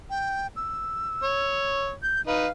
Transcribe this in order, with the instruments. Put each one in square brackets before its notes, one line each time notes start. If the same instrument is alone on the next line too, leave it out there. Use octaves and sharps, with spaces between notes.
[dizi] G5
E6
[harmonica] C#5
[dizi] G6
[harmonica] D#4 B4 [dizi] F5